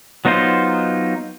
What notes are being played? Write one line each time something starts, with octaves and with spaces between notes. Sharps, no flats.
F#3 B3 D#4 F4 C5